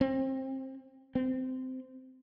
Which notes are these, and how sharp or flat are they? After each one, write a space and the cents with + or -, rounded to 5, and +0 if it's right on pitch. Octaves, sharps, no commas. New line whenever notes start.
C4 +25
C4 -20